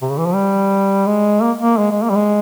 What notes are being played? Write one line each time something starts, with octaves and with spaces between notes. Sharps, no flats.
C3
C#3
E3
F3
G3
G#3
A#3
A#3
G#3
G#3
A#3
G3
G#3